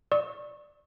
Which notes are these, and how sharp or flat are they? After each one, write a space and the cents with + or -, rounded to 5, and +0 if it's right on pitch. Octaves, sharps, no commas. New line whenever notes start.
D5 +5 C#6 -20 E6 -40